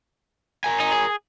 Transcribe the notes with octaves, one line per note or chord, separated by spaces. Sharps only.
A#4 G#5
D#4
G#4